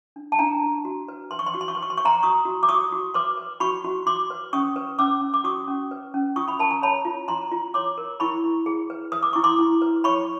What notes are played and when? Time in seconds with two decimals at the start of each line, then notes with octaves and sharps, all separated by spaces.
0.16 D4
0.32 A5
0.39 D4 G#5 A#5
0.63 G4
0.85 F#4
1.08 B4
1.31 B4 C6
1.39 C#6
1.46 C6
1.54 F#4 C#6
1.61 C6
1.68 C#6
1.75 B4 C6
1.83 C#6
1.90 C6
1.97 B4 C#6
2.05 A#5 C6
2.23 F#4 C#6 D#6
2.45 F#4
2.63 D6
2.69 F#4 C#6 D#6
2.92 F#4
3.14 B4 C6 D6
3.37 B4
3.60 F#4 B5 C#6
3.84 F#4
4.06 F#4 C6 D6
4.30 B4
4.53 C#4 C#6 D#6
4.76 B4
4.99 C#4 D6 E6
5.21 C#4
5.34 D6
5.44 F#4 C#6 D#6
5.67 C#4
5.91 B4
6.14 C#4
6.36 F4 C#6 D#6
6.48 B5 C#6
6.59 A#4 A5 B5
6.71 G#5 A#5
6.82 C#5 A5 B5
7.05 F4
7.28 F4 A#5 C6
7.52 F4
7.74 C#5 C6 D6
7.98 A#4
8.20 E4 B5 C#6
8.44 E4
8.66 G#4
8.90 B4
9.12 B4 D#6
9.23 D6
9.33 E4 C#6
9.44 C6 D6
9.59 E4
9.82 B4
10.04 C#5 B5 C#6